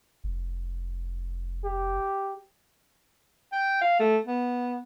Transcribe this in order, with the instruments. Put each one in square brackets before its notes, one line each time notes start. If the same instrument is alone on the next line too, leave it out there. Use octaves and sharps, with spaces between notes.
[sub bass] F1
[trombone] G4
[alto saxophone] G5
F5
A3
B3